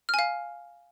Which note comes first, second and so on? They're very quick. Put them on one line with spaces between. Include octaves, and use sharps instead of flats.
F6 G#5 F5